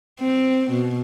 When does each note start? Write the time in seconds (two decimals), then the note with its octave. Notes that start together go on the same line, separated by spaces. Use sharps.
0.20 C4
0.71 B2